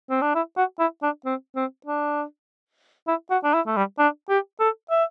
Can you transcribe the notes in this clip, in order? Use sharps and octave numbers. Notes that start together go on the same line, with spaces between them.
C4
D4
E4
F#4
E4
D4
C4
C4
D4
E4
F#4
D4
E4
A3
G3
D4
G4
A4
E5